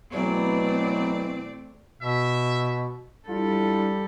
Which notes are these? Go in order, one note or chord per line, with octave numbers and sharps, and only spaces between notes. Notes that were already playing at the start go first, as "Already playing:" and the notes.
B2 E3 F#3 A3 C4 D5
B2 E5
G3 D4 E4 F4 A4